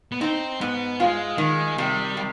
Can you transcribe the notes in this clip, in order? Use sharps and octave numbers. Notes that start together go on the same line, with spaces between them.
B3
C4 D#4
G#2 B3
G#3 F4
D#3 G#3
C3 G3
C3